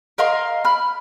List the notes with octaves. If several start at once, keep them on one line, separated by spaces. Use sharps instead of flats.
A#4 D#5 F5 C6
B5 F6